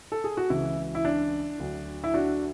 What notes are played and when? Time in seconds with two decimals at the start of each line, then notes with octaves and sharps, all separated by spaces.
0.12 A4
0.24 G#4
0.37 F#4
0.50 C#2 C#3 E3 E4
0.95 E4
1.05 D4
1.60 D2 D3 F#3
2.04 E4
2.14 D4 F#4